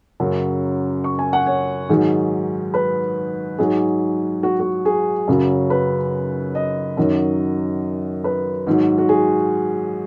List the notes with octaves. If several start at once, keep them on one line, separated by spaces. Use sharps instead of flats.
F#2 C#3 F#3
C#6
G#5
F#5
C#5
G#2 D#3 F#3 G#4
B4
G#2 F#3 G#4
F#4
F#4
G#4
F#2 C#3 F#3
B4
D#5
F#2 D#3 F#3
B4
G#2 D#3 F#3
F#4
G#4